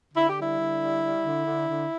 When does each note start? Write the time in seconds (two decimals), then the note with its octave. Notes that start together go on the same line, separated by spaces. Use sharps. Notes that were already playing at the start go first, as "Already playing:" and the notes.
0.14 D3 E4
0.27 G4
0.36 G3 E4
0.59 D3
0.80 G3
1.02 G3
1.24 D3
1.46 D3
1.69 D3